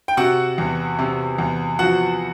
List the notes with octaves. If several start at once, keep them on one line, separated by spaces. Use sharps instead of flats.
G5
C3 F#4 F#5
E2
C3
E2
F3 F#4 F#5